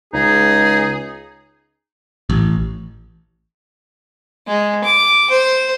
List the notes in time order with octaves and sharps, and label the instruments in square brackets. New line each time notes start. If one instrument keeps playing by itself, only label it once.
[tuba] C#2 [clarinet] D#4 [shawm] G#4
[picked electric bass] A1
[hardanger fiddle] G#3
D6
C5